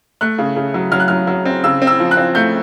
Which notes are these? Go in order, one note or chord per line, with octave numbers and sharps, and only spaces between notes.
A3 F#6
C#3
C#3
F#3
F#3 F6
F#6
F#3 F6
F#3
C4
C#3 E6
C4
E6
F3
F#6
C4
A3 G6